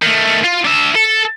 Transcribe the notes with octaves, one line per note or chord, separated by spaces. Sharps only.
D#3 A3
F4
D4 E5
A4